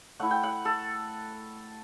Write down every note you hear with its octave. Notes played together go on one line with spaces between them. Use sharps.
A3 E4 F#5
G5
F#5
A4